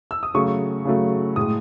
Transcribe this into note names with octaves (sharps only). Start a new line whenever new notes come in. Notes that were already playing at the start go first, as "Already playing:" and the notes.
E6
D#6
C#3 F#3 A3 C#6
C#3 F#3 A3
A2 G#3 D#6